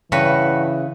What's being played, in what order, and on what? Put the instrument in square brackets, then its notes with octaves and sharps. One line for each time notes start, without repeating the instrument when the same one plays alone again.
[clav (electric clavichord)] G2 [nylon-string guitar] C#3 [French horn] E3 [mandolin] F#4 B4 C#6